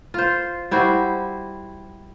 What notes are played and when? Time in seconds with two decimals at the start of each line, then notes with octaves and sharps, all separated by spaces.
0.14 F4 C5
0.71 G3 E4 F#4 C5